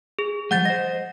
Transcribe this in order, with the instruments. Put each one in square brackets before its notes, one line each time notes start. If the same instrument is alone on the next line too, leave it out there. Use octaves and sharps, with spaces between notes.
[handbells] G#4
[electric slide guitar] F3 G3 G#3 [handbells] F#5 G6 A6
[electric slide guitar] C5 D#5 [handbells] A#6